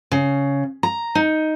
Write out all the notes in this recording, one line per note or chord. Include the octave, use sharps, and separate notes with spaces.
C#3
A#5
D#4